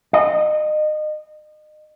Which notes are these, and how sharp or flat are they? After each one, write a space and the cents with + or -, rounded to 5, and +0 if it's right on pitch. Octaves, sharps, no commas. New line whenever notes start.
D#5 -30